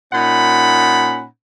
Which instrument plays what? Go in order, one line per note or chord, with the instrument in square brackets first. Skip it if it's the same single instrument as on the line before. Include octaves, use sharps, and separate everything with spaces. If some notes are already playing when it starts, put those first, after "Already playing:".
[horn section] A#2 C#4 D#4 F#5 B5